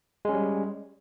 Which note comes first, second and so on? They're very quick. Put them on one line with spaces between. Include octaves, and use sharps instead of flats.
G#3 C#4 G3